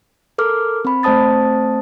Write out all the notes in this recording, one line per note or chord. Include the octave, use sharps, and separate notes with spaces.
A4 A#4 D6 F6
C4 B5
A3 C4 C5 A5 D#6 A6